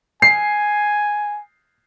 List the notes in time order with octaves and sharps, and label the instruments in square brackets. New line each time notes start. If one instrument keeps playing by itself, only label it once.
[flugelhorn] G#5 [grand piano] C7